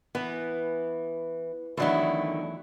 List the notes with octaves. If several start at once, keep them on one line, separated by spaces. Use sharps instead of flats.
E3 B3
E2 D3 D#3 F#3 A3 E4